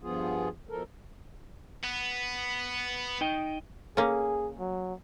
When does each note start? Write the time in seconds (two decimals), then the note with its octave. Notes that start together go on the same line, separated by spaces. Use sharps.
0.02 G2 F3 B3 F4 G#4
0.69 B2 F3 A4 A#4
1.83 B3
3.21 D#4 D#5 G5
3.97 A#3 C#4 G#4
4.59 F#3